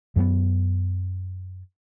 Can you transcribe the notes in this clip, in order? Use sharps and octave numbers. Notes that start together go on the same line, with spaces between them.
F#2 F#3 A3 B3